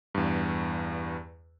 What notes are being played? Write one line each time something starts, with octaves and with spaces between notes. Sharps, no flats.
E2 G2